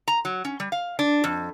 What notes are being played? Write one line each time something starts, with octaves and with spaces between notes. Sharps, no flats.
A#5
F#3
C#4
G3
F5
D4
F2